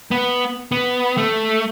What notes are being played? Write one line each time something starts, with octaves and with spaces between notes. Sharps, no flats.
B3
B3
A3